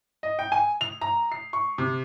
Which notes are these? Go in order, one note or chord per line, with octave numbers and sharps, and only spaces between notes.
D#5
G5
G#5
F7
A#5
C7
C#6
C3